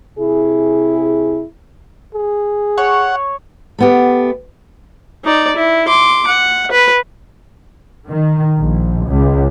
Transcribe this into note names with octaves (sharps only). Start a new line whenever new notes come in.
C3 E4 G#4
G#4
C#5 F#5
A3 B3 G4
D#4 D5
E4
C6 D6
F#5
B4
D#3
A#1
C#2